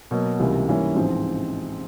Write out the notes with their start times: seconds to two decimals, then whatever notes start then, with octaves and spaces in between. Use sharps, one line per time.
0.11 B2 F#3 A#3
0.40 C#2 C3 E3 G3 A#3
0.68 G#2 E3 G3 A#3 C#4
0.95 A1 G#2 F3 G#3 C4